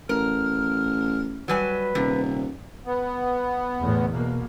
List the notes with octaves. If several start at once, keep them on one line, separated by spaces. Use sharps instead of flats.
A1 A#4 F6
F#3 G3 B4 G#5
D#1 C3
B3
E2 A2 D3
B2 A#3